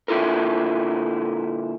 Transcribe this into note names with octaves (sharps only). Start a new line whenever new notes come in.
A#2 D3 E4 F4 A4 A#4